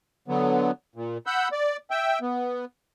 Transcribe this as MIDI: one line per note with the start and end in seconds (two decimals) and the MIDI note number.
0.28 0.71 50
0.28 0.71 54
0.28 0.71 59
0.95 1.18 46
1.26 1.48 78
1.26 1.48 83
1.26 1.48 88
1.26 1.48 91
1.52 1.77 74
1.91 2.19 76
1.91 2.19 79
2.22 2.65 59